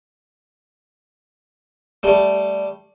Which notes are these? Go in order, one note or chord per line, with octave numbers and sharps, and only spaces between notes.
G3 A3